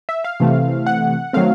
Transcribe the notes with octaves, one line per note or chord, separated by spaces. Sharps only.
E5
F5
C3 E3 A3 C4
F#5
D#3 F#3 A3 C4 F5